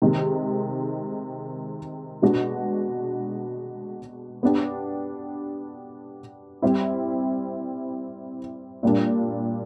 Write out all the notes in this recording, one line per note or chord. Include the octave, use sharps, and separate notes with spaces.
C3 D#3 G#3
B2 G#3 B3 D4 F#4
B3 D4 G4
G3 C4 E4
A#2 G3 A#3 D4